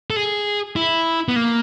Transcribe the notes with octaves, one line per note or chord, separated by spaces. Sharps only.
A4
G#4
E4
B3
A#3